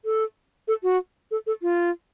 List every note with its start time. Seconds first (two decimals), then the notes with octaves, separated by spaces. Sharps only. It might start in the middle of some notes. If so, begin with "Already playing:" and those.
0.05 A4
0.68 A4
0.83 F#4
1.31 A4
1.47 A4
1.62 F4